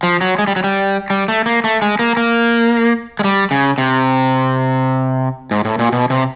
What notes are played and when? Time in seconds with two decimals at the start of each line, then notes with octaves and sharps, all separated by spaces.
0.03 F3
0.21 F#3
0.39 G#3
0.47 G3
0.56 F#3
0.64 G3
1.10 G3
1.28 A3
1.46 A#3
1.64 A3
1.82 G#3
1.99 A#3
2.17 A#3
3.19 G#3
3.24 G3
3.51 C#3
3.78 C3
5.51 G#2
5.65 A2
5.79 A#2
5.92 B2
6.10 C3